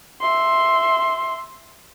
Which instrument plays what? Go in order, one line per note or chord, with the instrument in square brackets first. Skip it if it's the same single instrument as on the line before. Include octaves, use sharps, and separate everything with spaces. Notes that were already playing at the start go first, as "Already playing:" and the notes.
[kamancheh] E5 C6